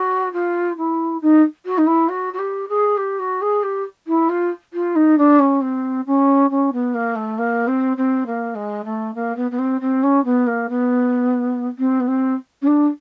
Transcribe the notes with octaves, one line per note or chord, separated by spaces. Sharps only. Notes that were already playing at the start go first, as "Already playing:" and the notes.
Already playing: F#4
F4
E4
D#4
F#4
D#4
E4
F#4
F#4
G4
G#4
G4
F#4
G#4
G4
E4
F4
F4
D#4
D4
C#4
C4
C#4
C#4
B3
A#3
A3
A#3
C4
C4
A#3
G#3
A3
A#3
B3
B3
C4
C4
C#4
B3
A#3
B3
C4
B3
C4
C#4
D4